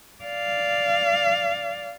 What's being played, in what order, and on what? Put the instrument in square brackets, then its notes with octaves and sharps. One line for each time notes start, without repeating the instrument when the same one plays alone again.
[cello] D5 F5